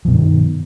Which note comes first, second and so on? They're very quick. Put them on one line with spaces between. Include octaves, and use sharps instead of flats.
F3 B2 G2 D#3